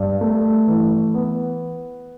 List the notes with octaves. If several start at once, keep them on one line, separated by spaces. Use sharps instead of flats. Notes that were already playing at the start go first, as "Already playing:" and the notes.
Already playing: G2
A3
E3
B3